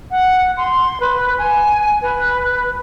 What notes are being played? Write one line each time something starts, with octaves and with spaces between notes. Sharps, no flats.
F#5
C6
B4
G#5
B4